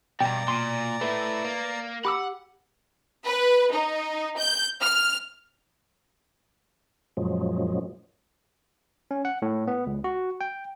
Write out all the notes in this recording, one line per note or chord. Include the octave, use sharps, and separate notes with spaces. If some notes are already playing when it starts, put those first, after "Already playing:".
E2 G2 B2 D5 G5 A#5
A#2 C6
A3 E4 B4
A#3
G4 F#5 B5 D6 E6
B4
D#4
G6
F6
F#2 A#2 F3 F#3 G#3
C#4
F#5
A2
B3
C#2
F#4
G5